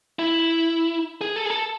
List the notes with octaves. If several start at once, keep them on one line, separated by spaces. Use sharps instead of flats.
E4
G#4
A4
G#4
A4